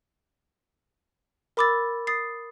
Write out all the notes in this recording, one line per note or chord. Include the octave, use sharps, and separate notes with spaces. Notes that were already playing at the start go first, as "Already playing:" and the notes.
A#4 B5 D6 E6 A6
D#6 A6 C7